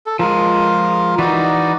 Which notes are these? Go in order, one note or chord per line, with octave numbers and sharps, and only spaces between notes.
A4
F3 G#3 F4 A#4
E3 D#4 F#4 D5